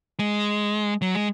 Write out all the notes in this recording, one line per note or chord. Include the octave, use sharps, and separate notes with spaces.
G#3
F#3
G#3